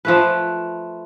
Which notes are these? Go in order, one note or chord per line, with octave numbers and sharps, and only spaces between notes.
F3 A3 B4